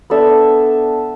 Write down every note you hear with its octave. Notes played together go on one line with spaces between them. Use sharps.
B3 D4 A4 E5